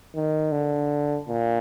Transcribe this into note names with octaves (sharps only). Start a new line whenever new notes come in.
D#3
D3
A#2